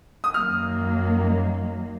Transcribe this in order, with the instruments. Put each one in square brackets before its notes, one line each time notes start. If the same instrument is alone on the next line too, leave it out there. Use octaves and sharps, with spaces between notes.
[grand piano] D#6
[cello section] F#2 D#3 F#3 A#3 [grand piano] F6